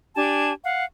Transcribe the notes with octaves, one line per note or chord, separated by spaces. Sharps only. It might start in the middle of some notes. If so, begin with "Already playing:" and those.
D4 G4 G#5 A5
F5 F#5